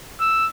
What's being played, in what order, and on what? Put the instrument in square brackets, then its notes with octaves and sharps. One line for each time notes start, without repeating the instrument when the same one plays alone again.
[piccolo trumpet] E6